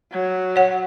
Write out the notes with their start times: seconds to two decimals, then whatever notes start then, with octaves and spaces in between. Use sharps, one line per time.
0.12 F#3
0.56 C#5 F#5